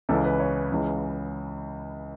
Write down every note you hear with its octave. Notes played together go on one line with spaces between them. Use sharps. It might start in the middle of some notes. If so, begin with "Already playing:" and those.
C#2 C#3 E3 A4
B4
C#5
C#2 C#3 E3